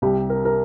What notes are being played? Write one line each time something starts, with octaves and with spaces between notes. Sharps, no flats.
C2 G4
A#4
A#4